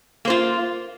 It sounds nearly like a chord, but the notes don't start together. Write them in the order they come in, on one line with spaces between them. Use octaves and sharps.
A#3 C5 F4